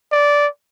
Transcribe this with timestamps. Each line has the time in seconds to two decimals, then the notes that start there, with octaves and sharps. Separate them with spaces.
0.12 D5